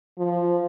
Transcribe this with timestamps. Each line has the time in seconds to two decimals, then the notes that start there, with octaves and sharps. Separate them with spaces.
0.18 F3